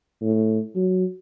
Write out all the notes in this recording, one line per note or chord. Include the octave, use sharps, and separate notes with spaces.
A2
F#3